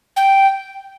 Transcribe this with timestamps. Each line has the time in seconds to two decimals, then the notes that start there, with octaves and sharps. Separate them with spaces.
0.17 G5